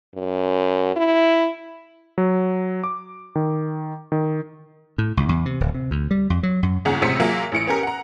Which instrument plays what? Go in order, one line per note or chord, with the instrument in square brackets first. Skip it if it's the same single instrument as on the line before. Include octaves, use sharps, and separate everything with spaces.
[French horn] F#2
E4
[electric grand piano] F#3
D6
D#3
D#3
[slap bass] A2
C#2
E2
C3
D1
C3
D2
G3
F2
F#3
F#2
[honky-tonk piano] G1 D#2 C#3 C#4 F#5 A#5
A1 C3 G#3 C5 B6 C#7
F#3 A#3 F4 G#4 E5
A1 E3 C#7 D7
B3 C#4 G4 A#4
F#5 A#5